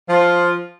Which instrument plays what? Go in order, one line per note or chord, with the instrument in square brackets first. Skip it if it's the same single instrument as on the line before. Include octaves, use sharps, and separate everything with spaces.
[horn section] F3 F4